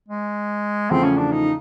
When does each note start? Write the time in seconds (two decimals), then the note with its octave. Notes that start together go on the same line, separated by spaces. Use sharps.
0.08 G#3
0.90 E2 C#3 F3 A3 C4
1.04 C#4
1.18 D4
1.32 D#4